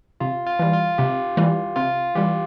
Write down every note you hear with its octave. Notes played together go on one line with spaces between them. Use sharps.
C3 F4
F4
E3 G3
F4
C3 G4
E3 G3
C3 F4
E3 G3 G4